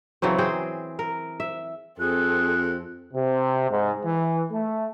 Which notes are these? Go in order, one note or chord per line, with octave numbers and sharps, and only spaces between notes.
C#3 E3 F#3 C4
C4 G#4 C5 G5
A#4
E5
F2 C4 G#4 A4 F#6
C3
G#2
E3
A3